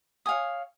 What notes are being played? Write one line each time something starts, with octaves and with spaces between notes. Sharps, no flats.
C#5 F5 G#5 D#6